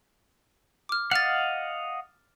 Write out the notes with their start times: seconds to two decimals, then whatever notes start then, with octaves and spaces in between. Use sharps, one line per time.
0.89 D6 F6
1.11 D#5 F5 F#5 F6 A6